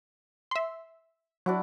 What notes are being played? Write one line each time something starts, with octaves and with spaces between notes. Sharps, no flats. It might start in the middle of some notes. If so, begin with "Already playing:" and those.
E5 C6
F#3 D4 E4 F#4